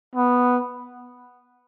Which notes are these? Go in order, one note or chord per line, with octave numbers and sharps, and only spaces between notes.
B3